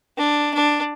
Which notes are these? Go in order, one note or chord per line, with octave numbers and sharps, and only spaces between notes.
D4
D4